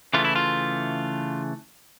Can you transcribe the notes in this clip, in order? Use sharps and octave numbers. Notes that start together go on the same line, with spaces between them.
C#3 E3 A3 F4
E4
F4